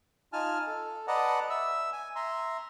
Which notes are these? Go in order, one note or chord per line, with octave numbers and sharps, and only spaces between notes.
D#4 F4 G#5 A5 F6
A4
B4 D5 D#5 F#5 A5 A#5
E5 E6
G#5
E5 A#5 C6